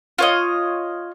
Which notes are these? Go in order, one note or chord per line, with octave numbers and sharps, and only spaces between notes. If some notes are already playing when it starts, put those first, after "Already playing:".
F4 C#5 D#5